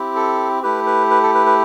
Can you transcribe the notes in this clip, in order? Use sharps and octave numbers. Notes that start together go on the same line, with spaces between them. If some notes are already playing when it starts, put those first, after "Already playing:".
Already playing: C4 E4 G4
A4
A3 E4 G4 B4
B4
B4
A4
B4
B4